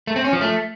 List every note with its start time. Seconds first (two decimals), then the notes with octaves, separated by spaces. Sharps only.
0.07 A3
0.16 C4
0.24 C#4
0.33 F3
0.41 A3